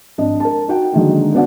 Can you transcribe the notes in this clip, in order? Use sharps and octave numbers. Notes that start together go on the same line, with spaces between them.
G#1 D4 D#5
A#4 A5
D#4 F#4 G5
D3 D#3 F#3 G#3 A#3 D#4
B3 C#4 D4 F#4 D5 F#5